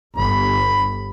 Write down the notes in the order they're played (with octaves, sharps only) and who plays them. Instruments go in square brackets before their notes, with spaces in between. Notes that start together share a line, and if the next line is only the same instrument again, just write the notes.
[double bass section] G1 [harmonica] B5